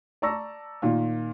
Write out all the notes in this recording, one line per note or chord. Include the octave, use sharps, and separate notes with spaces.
D5 A5 A#5 C#6 E6 A#6
A#2 D#3 A#3 F4